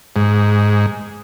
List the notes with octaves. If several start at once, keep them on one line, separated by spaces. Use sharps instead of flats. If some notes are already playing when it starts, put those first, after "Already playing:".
G#2